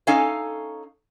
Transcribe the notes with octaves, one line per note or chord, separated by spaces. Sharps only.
C#4 D#4 A4 C#5 F5 G#5